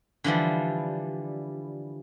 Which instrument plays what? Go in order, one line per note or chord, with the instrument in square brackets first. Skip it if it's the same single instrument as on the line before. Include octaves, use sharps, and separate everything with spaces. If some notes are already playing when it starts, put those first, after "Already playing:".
[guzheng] D3 E3 F3 G3